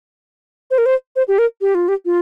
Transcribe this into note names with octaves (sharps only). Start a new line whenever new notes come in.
C5
A#4
C5
C5
G4
A#4
G4
F4
G4
F4